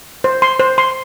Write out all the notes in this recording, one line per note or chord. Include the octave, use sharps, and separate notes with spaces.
C5
C6
C5
C6